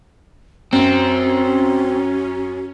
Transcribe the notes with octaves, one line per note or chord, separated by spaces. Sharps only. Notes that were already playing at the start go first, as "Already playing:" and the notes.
F#2 C4 C#4 F#4